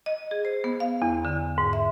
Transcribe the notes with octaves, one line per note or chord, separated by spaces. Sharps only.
D#5
G#4
C5
B3
F5
E2
D3
G#2
E5